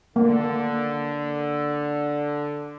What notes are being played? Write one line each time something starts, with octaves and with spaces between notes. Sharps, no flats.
D3 A#3